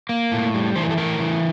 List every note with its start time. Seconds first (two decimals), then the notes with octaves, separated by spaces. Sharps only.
0.09 A#3
0.32 A2
0.54 G3
0.76 E3 C5
0.83 A#4
0.91 A4
0.97 A2 A#4
1.20 E3